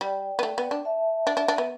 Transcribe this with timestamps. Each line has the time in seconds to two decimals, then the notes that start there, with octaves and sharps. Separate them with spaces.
0.01 G3 D5 G5
0.39 B3
0.43 A3
0.58 B3
0.71 D4
0.85 E5 A5
1.27 D4
1.37 D4
1.48 D4
1.58 B3